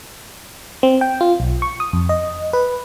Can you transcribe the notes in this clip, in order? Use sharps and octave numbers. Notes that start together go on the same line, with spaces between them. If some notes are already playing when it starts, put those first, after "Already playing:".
C4
G5
F4
B1
C#6
D#6
F2
D#5
B4